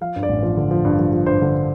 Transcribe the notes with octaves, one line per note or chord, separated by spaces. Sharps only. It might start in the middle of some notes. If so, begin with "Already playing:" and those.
F3 F5
G2
D5
A1
F3
D3
F3
G2
F3
F3
G2 C5
D3